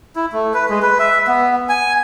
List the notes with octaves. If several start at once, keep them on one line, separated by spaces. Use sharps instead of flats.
E4
A3
B4
G#3
B4
E5
B3
G#5